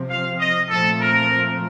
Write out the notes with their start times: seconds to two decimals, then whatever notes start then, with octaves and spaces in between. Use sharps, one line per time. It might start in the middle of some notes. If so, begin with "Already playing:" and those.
Already playing: C3 F3 C4
0.09 F5
0.39 D#5
0.69 A#2 F3 A3 C4 A4
1.00 A#4